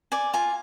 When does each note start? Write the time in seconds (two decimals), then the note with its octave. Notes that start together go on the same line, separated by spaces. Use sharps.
0.12 D5 G#5
0.34 F4 G#5